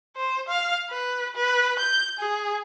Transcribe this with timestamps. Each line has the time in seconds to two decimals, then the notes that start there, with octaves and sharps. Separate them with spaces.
0.16 C5
0.48 F5
0.90 B4
1.35 B4
1.79 G6
2.19 G#4